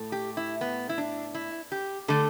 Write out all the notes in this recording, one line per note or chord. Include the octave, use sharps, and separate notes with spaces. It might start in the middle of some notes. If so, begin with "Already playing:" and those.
Already playing: A2 A3
G4
E4
B3
E4
D4
E4
G4
D3 A3 A4